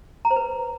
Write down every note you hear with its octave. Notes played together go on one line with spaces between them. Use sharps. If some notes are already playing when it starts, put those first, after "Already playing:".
A#5
C5
B4